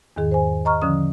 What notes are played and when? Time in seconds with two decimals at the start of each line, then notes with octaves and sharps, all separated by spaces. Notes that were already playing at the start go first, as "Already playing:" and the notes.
0.16 E2 G#2 D#3 G#4
0.31 C5 G#5
0.65 D#5 A#5 C#6 F6
0.82 D3 F3 C#4 D#6